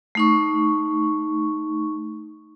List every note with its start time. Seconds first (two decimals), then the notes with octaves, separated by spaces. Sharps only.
0.15 A3 D#4 C#6